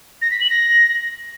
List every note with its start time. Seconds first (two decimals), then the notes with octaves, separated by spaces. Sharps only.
0.22 A#6
0.31 B6
0.41 F#7
0.50 A#6